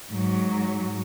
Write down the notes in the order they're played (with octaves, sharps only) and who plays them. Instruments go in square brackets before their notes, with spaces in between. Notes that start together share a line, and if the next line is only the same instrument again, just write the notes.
[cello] G#2 F#3